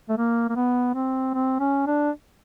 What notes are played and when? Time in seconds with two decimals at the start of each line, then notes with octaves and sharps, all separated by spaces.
0.09 A3
0.17 A#3
0.49 A#3
0.56 B3
0.95 C4
1.34 C4
1.60 C#4
1.87 D4